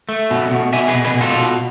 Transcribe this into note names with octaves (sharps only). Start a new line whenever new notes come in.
A3
B2
B2
B2 E5 G#5
G#4 B4
B2
G#4 B4
B2
F4 A4
B2